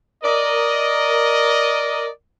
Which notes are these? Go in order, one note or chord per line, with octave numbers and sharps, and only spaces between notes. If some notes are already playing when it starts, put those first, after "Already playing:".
A#4 D5 D#5